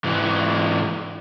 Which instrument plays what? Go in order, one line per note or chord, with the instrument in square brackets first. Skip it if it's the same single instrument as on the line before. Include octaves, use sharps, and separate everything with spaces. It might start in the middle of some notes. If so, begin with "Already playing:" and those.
[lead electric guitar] G#2 E3